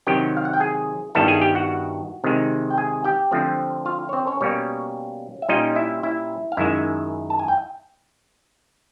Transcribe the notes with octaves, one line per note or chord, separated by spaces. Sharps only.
C3 D#3 F#3 G4 G5
F5
F#5
G5
G#4 G#5
G2 D#3 G3 B3 E4 A4 A5
G#4 G#5
G4 G5
F#4 F#5
C3 D#3 G#3
G5
G#4 G#5
G4 G5
D3 F3 A3 C4
F4 F5
C#5
C4 C5
C#4 C#5
B2 G3 A#3 C#4 C#5
E5
A#2 G3 A#3 C#4 D#4 F4 D#5
E4 E5
E4 E5
F5
F#2 D#3 G#3 E4 E5
A5
G#5
G5